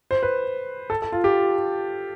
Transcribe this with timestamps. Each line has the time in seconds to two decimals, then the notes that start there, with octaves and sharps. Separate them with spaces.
0.11 C5
0.23 B4
0.90 A4
1.02 A4
1.12 F4
1.24 G4